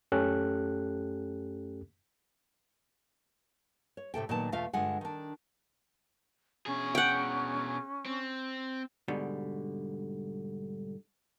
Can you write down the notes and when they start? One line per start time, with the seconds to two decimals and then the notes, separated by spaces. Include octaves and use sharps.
0.12 F#2 A3 C#4 G4 A4 F#6
3.97 C#5
4.14 A2 C3 A4 G5
4.29 A#2 D#3 F#3 B3 A5
4.52 E2 B2 A3 F4 E5 F5
4.73 G2 D3 G#3 F4 F#5 G#5
5.01 D#3 D4
6.66 B2 C#4 G#4
6.95 F#5 G5
8.06 C4
9.08 G#2 B2 D3 G3